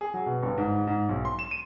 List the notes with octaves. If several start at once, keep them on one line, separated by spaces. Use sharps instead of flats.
G#4
F#3
B2
G1
G#2
G#2
B1
C6
E7
D#7